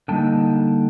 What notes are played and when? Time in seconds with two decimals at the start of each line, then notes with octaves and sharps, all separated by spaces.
0.08 D3 G3 A#3 D#4 G5 A5